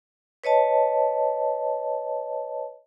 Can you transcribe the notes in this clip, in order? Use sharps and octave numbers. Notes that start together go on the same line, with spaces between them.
B4 C#5 D#5 A5